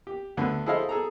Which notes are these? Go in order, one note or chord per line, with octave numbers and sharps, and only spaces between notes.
G4
D2 D3 A3 B3
E4 G#4 A4 C5 D#5 F5
G#4 A4 A#5